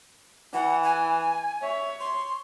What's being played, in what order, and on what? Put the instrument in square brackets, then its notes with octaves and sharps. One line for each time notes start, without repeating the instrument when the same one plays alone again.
[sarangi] E3 [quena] F#5
[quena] G#5
[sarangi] C#5 [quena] E5
[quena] C6